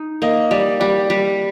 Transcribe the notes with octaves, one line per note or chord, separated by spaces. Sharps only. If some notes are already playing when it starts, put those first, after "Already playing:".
Already playing: D#4
A#3 D#5
G3 D5
G3 D5
G3